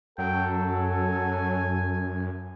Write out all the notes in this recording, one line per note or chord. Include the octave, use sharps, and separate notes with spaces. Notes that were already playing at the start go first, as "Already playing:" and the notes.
F#2 F#3 A4 G5
G#5